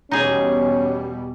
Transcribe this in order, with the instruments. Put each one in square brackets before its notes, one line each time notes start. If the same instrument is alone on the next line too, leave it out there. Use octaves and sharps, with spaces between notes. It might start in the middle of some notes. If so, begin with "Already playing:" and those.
[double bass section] E2 B2 G3 [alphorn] C#4 [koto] D#4 G#4